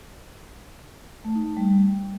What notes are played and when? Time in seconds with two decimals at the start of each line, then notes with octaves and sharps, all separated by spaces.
1.25 A3
1.35 D#4
1.46 A3
1.57 G3